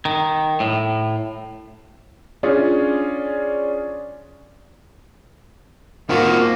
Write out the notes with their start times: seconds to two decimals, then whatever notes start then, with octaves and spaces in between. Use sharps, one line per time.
0.05 D#3
0.60 A2
2.43 C#4 D4 F4 G#4
6.09 D#3 A#3 C4 F4 F#4